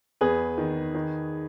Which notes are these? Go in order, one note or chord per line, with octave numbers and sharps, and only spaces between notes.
E2 G#4 B4
D#3
D#3